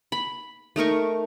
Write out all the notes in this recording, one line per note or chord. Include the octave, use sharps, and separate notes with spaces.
B5
A3 D#4 A#4 C#6